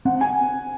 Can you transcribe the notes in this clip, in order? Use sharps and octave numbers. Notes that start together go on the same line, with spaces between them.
C4 F#5
G#5